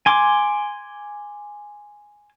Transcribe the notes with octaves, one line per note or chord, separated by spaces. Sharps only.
G#5 C6 D6